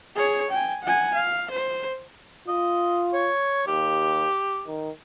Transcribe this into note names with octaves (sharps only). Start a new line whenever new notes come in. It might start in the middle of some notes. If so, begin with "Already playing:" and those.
G#4 C#5
G5 G#5
F#5 G#5
F5
C5
F4 D#5
C#5
D#2 G4
D#3